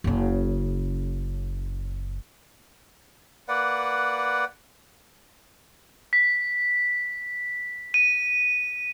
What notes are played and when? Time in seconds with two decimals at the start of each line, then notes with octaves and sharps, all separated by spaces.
0.04 F#1 C#3
3.48 A#3 B4 D5 F#5
6.13 B6
7.94 D#7